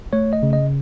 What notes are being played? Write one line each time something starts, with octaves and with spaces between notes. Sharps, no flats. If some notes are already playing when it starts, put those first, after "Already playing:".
A3 C#5
D#5
C#3
D#5